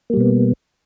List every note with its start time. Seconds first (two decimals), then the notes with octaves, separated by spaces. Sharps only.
0.10 A#3
0.13 G3
0.17 B2
0.20 B3